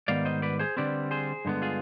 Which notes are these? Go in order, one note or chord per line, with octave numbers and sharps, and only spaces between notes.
G#2 D#3 G3 B3 D5 F5
C5 D#5
B4 D5
G#4 C5
D3 G3 C4 B4 D5
G#4 C5
G2 D3 G#3 B3
F4 G#4